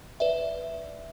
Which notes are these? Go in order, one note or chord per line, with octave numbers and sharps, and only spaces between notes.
B4 D5 E5